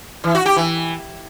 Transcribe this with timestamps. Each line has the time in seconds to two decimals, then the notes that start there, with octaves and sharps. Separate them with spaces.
0.24 E3
0.35 F#4
0.46 G4
0.56 E3